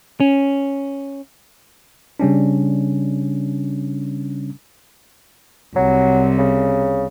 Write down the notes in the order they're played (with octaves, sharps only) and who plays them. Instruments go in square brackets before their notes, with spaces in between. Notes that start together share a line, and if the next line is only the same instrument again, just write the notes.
[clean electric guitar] C#4
[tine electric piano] C#3 G3 C#4 D4
[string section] C2 [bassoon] F#3
[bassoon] C#3